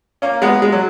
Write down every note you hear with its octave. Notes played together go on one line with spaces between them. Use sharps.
A#3 C#4
G#3 B3
G#3
F#3